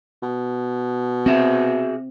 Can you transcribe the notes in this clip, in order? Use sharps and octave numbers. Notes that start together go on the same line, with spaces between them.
B2
C4 F#4 G#4 E5